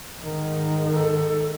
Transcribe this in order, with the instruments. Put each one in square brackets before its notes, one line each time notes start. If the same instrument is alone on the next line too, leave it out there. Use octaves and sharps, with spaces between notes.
[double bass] G#2 D#3
[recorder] A4